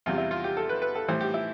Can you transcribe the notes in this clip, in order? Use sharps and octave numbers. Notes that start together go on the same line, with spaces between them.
E2 C3 G3 F4
E4
F4
G4
A4
B4
B4
A4
A2 E3 G3 C5
G4
E4